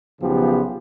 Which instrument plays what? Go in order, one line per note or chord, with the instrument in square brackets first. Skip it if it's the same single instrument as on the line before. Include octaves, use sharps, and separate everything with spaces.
[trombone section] B1 C#3 F3 B3 G4